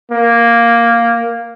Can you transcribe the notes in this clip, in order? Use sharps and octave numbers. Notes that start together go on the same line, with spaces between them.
A#3